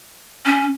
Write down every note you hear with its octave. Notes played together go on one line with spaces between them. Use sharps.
C#4